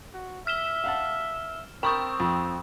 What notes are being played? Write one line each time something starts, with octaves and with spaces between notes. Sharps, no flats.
F#4
E5 F6 E7 G7
F5 F#5 A5
C4 A#4 G5 B5 C#6 D#6
F2